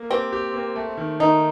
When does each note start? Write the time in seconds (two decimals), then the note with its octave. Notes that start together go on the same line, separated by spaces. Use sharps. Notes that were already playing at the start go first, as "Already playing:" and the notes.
Already playing: A#3
0.10 C4 G4
0.32 G4
0.54 A#3
0.76 A3
0.97 D#3
1.20 D#3 D#4